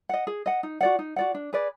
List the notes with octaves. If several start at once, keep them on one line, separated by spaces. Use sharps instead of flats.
D#5 F#5
G#4
D#5 F#5
D#4
F#4 D5 F#5
D#4
F#4 D5 F#5
D4
G#4 B4 D5